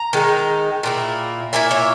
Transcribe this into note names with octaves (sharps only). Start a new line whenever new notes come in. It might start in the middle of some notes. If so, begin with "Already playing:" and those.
Already playing: A#5
D#3 G#3 D#4
A#2 A#3 E4
A#2 A#3 E4 E5 G#5
C#5 E5